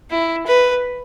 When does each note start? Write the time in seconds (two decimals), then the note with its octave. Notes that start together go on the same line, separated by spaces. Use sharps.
0.10 E4
0.47 B4